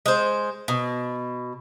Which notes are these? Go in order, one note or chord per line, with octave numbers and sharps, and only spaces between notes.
G#3 C5
B2